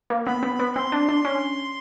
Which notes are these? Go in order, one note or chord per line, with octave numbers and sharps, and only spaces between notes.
A#3
B3 B5
B3
B3
C4 C6
D4
D4
C#4